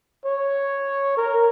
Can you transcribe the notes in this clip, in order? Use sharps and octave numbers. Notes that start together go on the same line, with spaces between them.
C#5
A#4